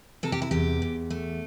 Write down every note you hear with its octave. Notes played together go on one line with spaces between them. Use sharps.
C3 A4
G4
E4
E2 G4
E2
A3